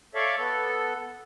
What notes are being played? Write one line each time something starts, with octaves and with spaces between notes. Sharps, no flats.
A4 C#5 D5 E5 F5
B3 A4